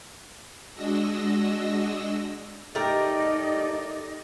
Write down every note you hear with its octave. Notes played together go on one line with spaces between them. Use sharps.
G#3 D4 F#4 D#5 E6 A#6
A3 D#4 G4 A#4 D5 D#5